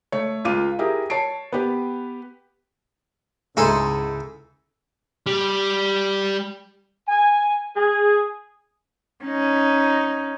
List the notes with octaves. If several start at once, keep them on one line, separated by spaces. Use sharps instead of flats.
A3 C#5
C#2 F4 F5 D6 D#7
E4 G4 G#4 A#4
C#5 A5 C7 D7
B3 G4 B4
C#2 G#2 E4 G#4 A4 E5 C6
G3
G#5
G#4
C#4 D#4